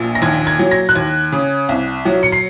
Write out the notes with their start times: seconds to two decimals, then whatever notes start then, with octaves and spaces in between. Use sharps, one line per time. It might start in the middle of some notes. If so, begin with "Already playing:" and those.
Already playing: A#1 A#2
0.15 A#6
0.22 D#2 G#6
0.47 G#6
0.59 F#3
0.71 A#6
0.89 F#6
0.95 D#2 G#6
1.32 C#3
1.69 C2
2.05 F#3
2.23 C#7
2.32 C7